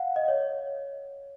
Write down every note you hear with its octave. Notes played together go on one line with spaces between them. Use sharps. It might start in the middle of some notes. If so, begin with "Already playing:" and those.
Already playing: F5 F#5
D#5
C#5